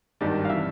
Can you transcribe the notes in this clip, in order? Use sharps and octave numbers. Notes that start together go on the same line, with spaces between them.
G#1 G2 D#3 G3 D5
F5
C3 E3 E5